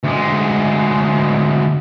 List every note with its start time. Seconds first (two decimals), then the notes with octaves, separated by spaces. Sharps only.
0.04 D2 G#3